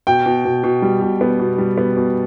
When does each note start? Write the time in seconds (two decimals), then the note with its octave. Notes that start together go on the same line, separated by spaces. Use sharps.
0.07 B2 G5
0.26 B2
0.45 B2
0.64 B2
0.82 G3
1.01 B2
1.21 B3
1.39 B2
1.58 G3
1.78 B3
1.97 B2